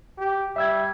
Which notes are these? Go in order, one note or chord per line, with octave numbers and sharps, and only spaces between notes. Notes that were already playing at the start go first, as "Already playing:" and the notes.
G4
G3 E5 E6 G#6